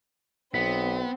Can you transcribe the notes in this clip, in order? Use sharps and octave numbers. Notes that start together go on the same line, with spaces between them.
B1 B3 C4 B6